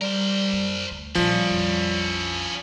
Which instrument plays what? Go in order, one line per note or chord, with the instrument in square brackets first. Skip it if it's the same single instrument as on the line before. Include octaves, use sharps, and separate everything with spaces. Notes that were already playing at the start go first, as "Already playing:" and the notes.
[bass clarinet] G3 [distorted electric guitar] A#4 C5
[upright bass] F#2
D2
[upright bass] C2 A#2 [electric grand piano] F3 [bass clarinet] G3 [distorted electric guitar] C#4 E4
[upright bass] A#1 F2